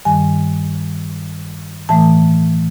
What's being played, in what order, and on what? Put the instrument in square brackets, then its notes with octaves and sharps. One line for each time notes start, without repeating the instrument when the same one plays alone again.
[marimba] G2 D#3 G3 G#5
A2 E3 A3 A5